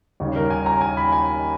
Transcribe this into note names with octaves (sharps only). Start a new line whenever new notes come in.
D#2 C#3 G3 C#4
A#4
G#5
A#5
G#5
B5
G#5